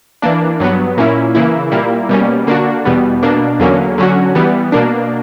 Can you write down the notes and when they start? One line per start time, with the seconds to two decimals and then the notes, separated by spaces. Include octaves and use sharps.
0.22 E3 A#3 D4
0.60 G2 F#3 B3
0.98 A#2 A#3 C#4 E4
1.35 C#3 E3 A#3 E4
1.72 A#2 G3 A#3 E4
2.09 B2 G3 A#3 C#4
2.47 D3 A#3 D4 F#4
2.85 E2 B2 G3 B3
3.23 B2 A#3 D4
3.60 E2 D3 F#3 A#3 C#4
3.98 D3 F#3 C#4 F#4
4.35 E3 G3 B3
4.72 B2 A#3 D4